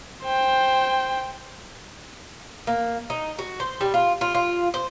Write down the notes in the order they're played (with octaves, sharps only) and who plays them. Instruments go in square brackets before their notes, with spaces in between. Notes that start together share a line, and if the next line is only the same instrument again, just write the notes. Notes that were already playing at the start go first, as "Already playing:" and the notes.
[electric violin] C5 G5
[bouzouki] A#3
D#4
F#4
C5
G3
F4
F4
F4
C5